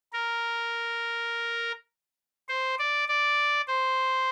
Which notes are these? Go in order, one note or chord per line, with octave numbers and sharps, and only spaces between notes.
A#4
C5
D5
D5
C5